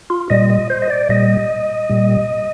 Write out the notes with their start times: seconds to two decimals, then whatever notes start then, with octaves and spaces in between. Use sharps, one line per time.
0.10 F4
0.30 A#2 G3 D#5
0.50 D#5
0.70 C5
0.82 D#5
0.90 D5
1.09 A#2 G3 D#5
1.89 A#2 G3